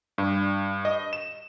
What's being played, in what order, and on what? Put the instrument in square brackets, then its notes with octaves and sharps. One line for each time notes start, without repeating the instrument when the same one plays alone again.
[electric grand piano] G2
D#5
E7